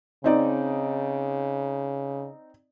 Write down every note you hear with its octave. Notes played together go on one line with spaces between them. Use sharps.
C#3 C4 D#4 D5